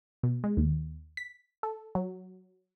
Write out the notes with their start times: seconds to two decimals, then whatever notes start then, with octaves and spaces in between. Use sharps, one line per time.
0.23 B2
0.44 G#3
0.57 D#2
1.17 B6
1.63 A4
1.95 F#3